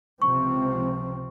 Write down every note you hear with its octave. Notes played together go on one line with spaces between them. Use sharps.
C#2 C3 F3 C4 C#6